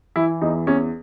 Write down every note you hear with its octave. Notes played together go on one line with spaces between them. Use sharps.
E3 E4
E2 D#4
E2 C#4